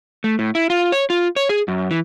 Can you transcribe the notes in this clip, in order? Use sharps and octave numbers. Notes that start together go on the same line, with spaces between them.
A3
A2
E4
F4
C#5
F4
C#5
G#4
F#2
E3